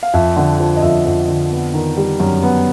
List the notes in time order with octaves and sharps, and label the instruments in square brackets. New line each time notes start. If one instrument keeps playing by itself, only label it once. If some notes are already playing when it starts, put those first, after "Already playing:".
[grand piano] F5
F2 E5
D3
F3
D#5
F2 E5
F2
D3
B3
D#3
G3
F#2
B3